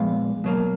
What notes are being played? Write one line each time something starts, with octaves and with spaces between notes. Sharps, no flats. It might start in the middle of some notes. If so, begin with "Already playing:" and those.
Already playing: A#2 F3 G#3 B3 F5
B2 F#3 A#3